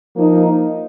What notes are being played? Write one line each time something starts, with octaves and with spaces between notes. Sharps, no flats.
F3 A#3 D#4